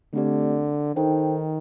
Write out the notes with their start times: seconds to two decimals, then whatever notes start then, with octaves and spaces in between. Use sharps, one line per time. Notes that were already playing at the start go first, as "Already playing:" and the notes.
0.14 D3 A3 C4 G4 D5
0.96 D#3 D#4 A4 C5 G5